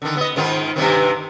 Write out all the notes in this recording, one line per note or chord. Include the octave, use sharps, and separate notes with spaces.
D3 D#3
B3 D#5
G#2 D#3 F4
G2 C3 D#3